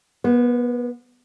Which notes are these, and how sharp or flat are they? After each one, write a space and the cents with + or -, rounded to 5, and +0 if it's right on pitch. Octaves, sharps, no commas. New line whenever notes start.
B3 -30 B4 +40